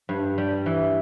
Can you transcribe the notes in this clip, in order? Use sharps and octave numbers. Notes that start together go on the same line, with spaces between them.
G2
G3
E3